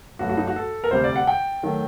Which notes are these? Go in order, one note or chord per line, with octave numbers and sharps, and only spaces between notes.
G2 F#3 A3 F#4
F#4
D#4
F#4
A4
A#4
D2 C3 G3 C5
D5
F#5
G5
D#3 F#3 A3